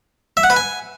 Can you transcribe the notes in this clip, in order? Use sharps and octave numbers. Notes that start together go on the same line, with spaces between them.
E5
F#5
B4
G#5